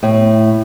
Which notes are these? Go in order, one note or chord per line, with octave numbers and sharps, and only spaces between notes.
A2